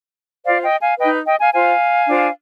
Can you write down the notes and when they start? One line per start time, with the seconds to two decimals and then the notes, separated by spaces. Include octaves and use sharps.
0.44 F4 C5 D5 F5
0.63 D#5 G5
0.81 F5 G#5
0.98 D#4 B4 D#5 G5
1.26 D#5 G5
1.40 F5 G#5
1.53 F4 C5 F5 G#5
2.07 D4 F4 C5